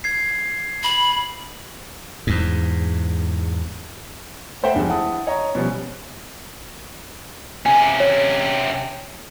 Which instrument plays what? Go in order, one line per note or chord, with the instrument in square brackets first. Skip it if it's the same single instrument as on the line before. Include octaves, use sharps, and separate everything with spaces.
[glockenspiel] G#6 C7
[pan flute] B5
[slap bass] E2 G#2
[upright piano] A3 A4 C5 E5 F#5 G5
E2 G2 F3 G#3
E4 F#5 A5 D#6
C#5 D#5 A#5
B2 F3 G3 C#4
[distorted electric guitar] C3 C#4 [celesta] G#5
[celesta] C#5